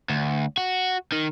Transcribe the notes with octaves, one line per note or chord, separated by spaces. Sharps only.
D2
F#4
D#3